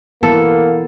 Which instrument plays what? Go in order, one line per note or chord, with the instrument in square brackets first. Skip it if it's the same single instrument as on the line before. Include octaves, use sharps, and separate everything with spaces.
[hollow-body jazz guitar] E3 [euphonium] A#3 [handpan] B3 [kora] A4